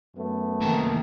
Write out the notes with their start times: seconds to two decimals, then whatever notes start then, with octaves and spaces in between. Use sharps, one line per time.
0.16 F#2 A3 B3
0.61 C3 D#3 A#3 A5